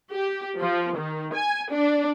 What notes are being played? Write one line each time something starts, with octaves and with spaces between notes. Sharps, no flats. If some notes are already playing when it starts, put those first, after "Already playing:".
G4
F3
D#3
G#5
D4